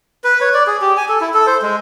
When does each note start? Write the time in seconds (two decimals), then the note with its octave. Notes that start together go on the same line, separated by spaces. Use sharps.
0.24 B4
0.41 C#5
0.54 D5
0.67 G#4
0.81 G4
0.97 G#5
1.09 A4
1.21 E4
1.34 A4
1.47 C5
1.62 G#3